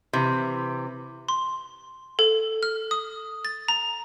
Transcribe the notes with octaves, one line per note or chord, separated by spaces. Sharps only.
C3 E3
C6
A4
F6
D#6
A6
A#5